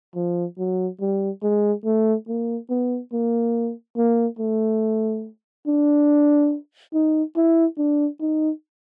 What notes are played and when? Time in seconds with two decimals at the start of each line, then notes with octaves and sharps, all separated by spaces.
0.15 F3
0.58 F#3
1.01 G3
1.43 G#3
1.85 A3
2.28 A#3
2.70 B3
3.13 A#3
3.97 A#3
4.39 A3
5.67 D4
6.93 D#4
7.36 E4
7.78 D4
8.21 D#4